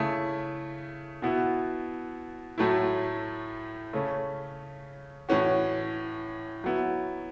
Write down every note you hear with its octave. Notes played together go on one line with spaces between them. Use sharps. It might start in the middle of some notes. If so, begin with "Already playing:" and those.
Already playing: C#3 A3 E4
B2 B3 E4
A2 F#3 A3 E4
C#3 A3 C#4
A2 E3 C#4 F#4
F#3 B3 E4